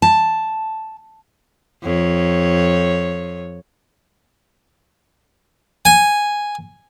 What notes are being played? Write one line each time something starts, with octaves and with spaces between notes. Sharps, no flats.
A5
F2 C#5
G#5